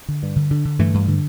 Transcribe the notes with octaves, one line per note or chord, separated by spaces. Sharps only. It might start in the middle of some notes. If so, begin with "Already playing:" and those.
D3
G2
D3
D3
D3
G2 E3 A3
G2
D3